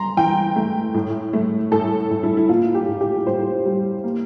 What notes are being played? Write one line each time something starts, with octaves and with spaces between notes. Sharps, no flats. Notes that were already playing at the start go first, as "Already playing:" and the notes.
Already playing: A#5 C6
E3 G5
A3
A2
A3
A2 A4
A2
E4
E4
A#3 F4
G4
A2
G4
A2 C5
G3
A#3